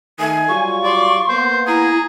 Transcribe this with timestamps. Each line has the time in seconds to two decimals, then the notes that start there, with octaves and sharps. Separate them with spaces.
0.19 D#3 A3 G#5
0.48 F#3 G3 F4 C#6
0.84 D5 C6
1.29 A#3 B3 C5
1.67 E4 G#4 A#5